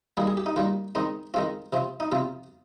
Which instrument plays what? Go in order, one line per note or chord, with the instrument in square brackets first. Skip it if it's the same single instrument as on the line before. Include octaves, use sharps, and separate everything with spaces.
[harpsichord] D#3 G3 A#3 G#4
G#4
G4
D#4
D#3 G3 A#3 F4
D#3 G#3 C4 D#4
D#3 G#3 C4 F4
C3 F3 C4
D#4
C3 F3 C4 F4